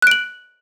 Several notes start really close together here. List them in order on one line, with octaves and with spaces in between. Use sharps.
F#6 D7 F#7